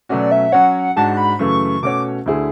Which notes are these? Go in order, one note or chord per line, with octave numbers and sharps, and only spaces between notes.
B2 F#3 A3 C#4 F#4 D5
E5
F#3 C#4 F#4 C#5 F#5
G#2 G#3 D4 F#4 A5
B5
F#2 C#3 E3 A3 C#6
B2 A3 C#4 F#4 C#5 D6
D2 D3 A3 E4 G#4